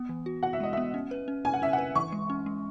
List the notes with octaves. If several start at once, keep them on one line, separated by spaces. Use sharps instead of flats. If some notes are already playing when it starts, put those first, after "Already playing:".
Already playing: B3
E3
F#4
F#4 F#5
E5
G#3 D#5
B3 E5
C#4
B4
C#4
C#4 G#5
F#5
C#4 E5
F#5
B4
E3 C#6
G#3
C#4
G#3